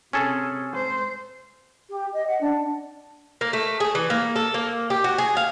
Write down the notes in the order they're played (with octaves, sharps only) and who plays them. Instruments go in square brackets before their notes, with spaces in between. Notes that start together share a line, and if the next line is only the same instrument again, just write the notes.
[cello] C3 [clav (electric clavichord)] C#4 G#4 A4
[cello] C5
[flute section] G4
D#5
F#5
D4
[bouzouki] A#3
A3
G#4
E3
A#3
A4
A#3
G4
F#4
G#4
F5